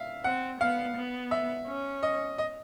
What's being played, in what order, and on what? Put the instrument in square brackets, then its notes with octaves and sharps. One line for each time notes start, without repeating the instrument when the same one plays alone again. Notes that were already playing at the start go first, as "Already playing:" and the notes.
Already playing: [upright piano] E5 F5
[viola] C4 [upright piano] F#5
[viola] B3 [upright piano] F5
[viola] B3
[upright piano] E5
[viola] C#4
[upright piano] D#5
D#5